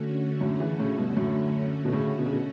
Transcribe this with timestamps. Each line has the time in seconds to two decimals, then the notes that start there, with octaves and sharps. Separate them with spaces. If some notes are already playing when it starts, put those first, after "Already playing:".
Already playing: D3 A3 C#4 F#4
0.41 F#2 A2
0.60 C#3 E3
0.79 A2 C#3
0.98 G2 B2
1.17 F#2 A2
1.85 B2
1.92 A2 C#3
2.18 B2
2.26 C#3
2.32 B2